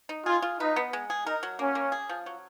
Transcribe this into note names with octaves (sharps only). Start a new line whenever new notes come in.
D#4
F4 G#4
F4
D#4 B4
B3
G#3
G#4
D#4 A#4
F#3
A#3 C#4
A#3
G#4
F3
F#3